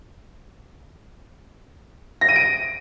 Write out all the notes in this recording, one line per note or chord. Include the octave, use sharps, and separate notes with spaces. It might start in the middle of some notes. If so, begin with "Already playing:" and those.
A#6
D#7
D7